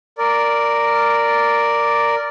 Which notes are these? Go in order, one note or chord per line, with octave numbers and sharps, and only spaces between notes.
A#4 D5